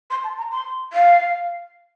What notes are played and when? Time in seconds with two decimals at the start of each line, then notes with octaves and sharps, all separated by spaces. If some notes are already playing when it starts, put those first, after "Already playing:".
0.10 C6
0.24 A5
0.37 A#5
0.51 C6
0.93 F5